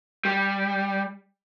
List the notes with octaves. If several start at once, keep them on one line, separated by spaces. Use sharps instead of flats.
G3